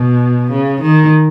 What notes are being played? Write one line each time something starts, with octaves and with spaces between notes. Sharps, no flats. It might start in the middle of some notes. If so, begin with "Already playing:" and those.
Already playing: B2
C#3
D#3